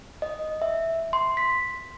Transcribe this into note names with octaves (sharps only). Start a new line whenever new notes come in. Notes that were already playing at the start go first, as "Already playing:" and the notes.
D#5
E5
C6
B6